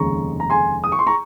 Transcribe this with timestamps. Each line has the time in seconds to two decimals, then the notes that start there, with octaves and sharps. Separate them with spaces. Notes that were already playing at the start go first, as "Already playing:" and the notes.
Already playing: F1 D#2 C#3 G#3 A#5 C#6
0.40 A#5
0.50 G#5 C6
0.84 D#6
0.92 C#6
0.99 C6
1.07 A#5 C#6